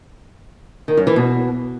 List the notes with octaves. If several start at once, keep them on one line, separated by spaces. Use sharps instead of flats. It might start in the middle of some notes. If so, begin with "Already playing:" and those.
D#3
F#2
E3
B2